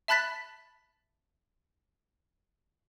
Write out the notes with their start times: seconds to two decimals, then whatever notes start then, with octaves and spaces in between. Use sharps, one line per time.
0.08 E5 A5 B5 F#6 A6 B6